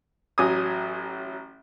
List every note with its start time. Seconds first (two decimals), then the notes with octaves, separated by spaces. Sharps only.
0.38 A1 F#3 G#5 D#6